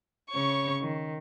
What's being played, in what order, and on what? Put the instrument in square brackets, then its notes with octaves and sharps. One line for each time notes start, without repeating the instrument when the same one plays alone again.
[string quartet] C#3 C#5 C#6
D#3